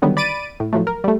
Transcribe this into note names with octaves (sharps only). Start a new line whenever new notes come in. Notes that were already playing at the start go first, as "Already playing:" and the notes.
D3 D#3 F#3 G3 B3
D5 B5 A6 D7 D#7
A2
A2 F3 F#3 A3
A#4
G3 A3